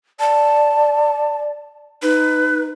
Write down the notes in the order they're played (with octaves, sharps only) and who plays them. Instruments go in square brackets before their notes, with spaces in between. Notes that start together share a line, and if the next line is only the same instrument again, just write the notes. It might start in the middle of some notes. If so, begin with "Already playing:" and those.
[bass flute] D5 [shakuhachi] A5
[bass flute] D#4 [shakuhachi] B4